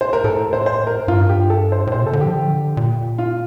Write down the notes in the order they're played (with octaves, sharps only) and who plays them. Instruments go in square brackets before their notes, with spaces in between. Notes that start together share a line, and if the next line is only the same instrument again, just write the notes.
[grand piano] C5
A#4
[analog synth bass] A2 [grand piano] A4
[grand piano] C5
C5
A#4
[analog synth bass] G2 [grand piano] F4
[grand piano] G4
A4
C5
[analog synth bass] A2
[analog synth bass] A#2 [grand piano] C5
[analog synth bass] C3 [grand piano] A4
[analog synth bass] D3
[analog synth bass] F3 [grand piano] G4
[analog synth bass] D3
A#2
[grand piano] F4